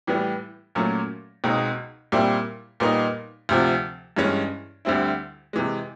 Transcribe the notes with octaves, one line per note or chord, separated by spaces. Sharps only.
A2 E3 G3 B3
A#2 F#3 A3 C#4
C#2 B2 G#3 C4 D#4
A#2 G3 C4 E4
A#2 G3 B3 D#4
D2 C3 F3
G2 E3 G#3 C#4
D2 D3 G3 C4 E4
C3 E3 G#3